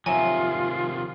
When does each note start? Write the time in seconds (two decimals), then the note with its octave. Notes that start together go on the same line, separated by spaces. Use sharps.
0.06 C3 D#3 F3 F#3 F4 E5 G#5